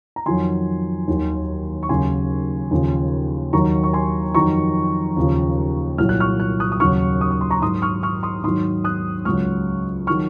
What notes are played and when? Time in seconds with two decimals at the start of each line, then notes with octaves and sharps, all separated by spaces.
0.16 A#5
0.26 F2 D#3 F#3 G#5 C6
1.08 D#2 D#3 F#3
1.83 C#6
1.89 D#2 C#3 F#3 G#5 C6
2.71 D#2 C#3 F3
3.53 D#2 D#3 F#3 A#5 C#6
3.83 C#6
3.93 G#5 C6
4.35 F2 D#3 F#3 A#5 C#6
5.17 D#2 C#3 F3
5.98 C2 A#2 F#3 F6
6.09 F#6
6.20 C#6 F6
6.40 F#6
6.60 D#6 F#6
6.72 D#6
6.80 D#2 C#3 F#3 C#6 F6
7.21 D#6
7.31 C#6
7.41 C6
7.50 A#5 C#6
7.62 G#2 F#3 C6 D#6
7.82 C#6 F6
8.03 C#6 F6
8.23 C6 D#6
8.44 G#2 D#3 F#3 C6 D#6
8.84 D#6 F#6
9.25 C#2 C#3 F#3 C#6 F6
10.07 D#3 F#3 C#6 F6